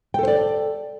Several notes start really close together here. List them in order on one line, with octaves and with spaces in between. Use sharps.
G5 A4 C5 D5